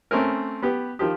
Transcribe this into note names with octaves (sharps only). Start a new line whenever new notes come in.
A3 C4 C#4 A#4
B3 G4
D#3 F3 G4